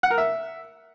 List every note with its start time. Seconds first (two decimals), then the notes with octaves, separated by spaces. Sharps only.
0.03 F#5
0.10 A#4
0.18 E5